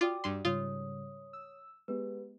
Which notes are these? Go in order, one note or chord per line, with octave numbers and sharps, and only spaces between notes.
F4 F#4 D5 G5 D6 D#6
G2 C6
G#2 C#3 G3 F4 C#5 D#6
E6
G#3 B3 G4 B4